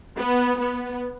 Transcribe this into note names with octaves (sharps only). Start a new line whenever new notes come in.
B3
B3